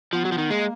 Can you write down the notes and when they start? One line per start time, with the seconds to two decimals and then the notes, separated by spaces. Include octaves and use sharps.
0.13 F3 B3
0.25 F#3
0.32 F3
0.38 D#3
0.50 G#3 A#3